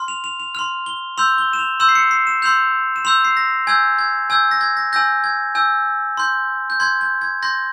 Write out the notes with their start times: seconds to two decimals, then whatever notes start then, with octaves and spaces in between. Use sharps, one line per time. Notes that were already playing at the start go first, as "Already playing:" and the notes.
Already playing: C6 F6
0.08 F7
0.24 F7
0.40 F7
0.55 C6 F6 F7
0.86 G7
1.18 C6 E6 G6 F7
1.38 G7
1.53 E7
1.59 F7
1.80 C6 E6 G6 E7
1.89 C7
1.95 C#7
2.11 C7
2.27 E7
2.42 C6 E6 G6 F7
2.96 E7
3.05 C6 E6 G6 F7
3.25 C7
3.37 A#6
3.67 G#5 E6 G6 G#6
3.99 G#6
4.30 G#5 E6 G6 G#6
4.51 A#6
4.61 G#6
4.77 A#6
4.93 G#5 E6 G6 A#6
5.24 G#6
5.55 G#5 E6 G6
6.17 C6 G6
6.70 G6
6.80 C6 G6 G#6
7.01 G6
7.21 G#6
7.42 C6 G6 A#6